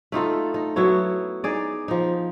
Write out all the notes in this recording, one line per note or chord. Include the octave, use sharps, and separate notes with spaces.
A3 D#4 F4 A4
D#4
F#3 B3 E4 C#5
D#4 G#4 D5
F3 D#4